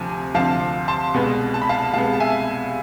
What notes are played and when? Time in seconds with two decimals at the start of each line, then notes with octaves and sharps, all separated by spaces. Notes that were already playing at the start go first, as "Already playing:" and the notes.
Already playing: D2 C3 F3 G#5
0.34 D2 C3 F3 F5 A5
0.88 A5 C6
1.14 C2 B2 G#3 B3
1.54 A5
1.62 B5
1.69 F5 A5
1.93 C2 B2 G#3 B3 F5 A5
2.13 A5
2.20 E5 G#5